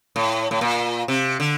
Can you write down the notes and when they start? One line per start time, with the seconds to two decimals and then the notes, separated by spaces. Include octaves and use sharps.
0.16 A2
0.51 A2
0.61 A#2
1.08 C3
1.40 D3